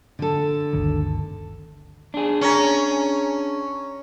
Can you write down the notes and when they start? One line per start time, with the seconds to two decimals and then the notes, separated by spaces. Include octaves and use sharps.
0.19 D3 A4
0.73 G1 D2 D#3
2.14 D4 G#4
2.41 C#4 C#5 A#5